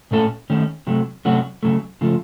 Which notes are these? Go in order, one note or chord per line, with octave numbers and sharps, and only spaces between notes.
A#2 A3 C#4 A4
D#3 A3 C#4
C3 F#3 A3
C3 F#3 A3 C#4 F#4
C#3 F#3 A3
C#3 F3 A3